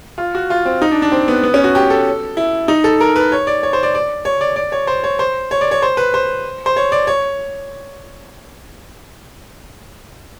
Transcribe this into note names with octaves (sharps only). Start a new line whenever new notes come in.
F4
F#4
F4
C4
D#4
D4
D4
C4
B3
B3
C#4
F#4
G4
A4
E4
D#4
A4
A#4
B4
C#5
D5
C#5
C5
D5
D5
C#5
D5
D5
C#5
C5
C#5
C5
C#5
D5
C#5
C5
B4
C5
C5
C#5
D5
C#5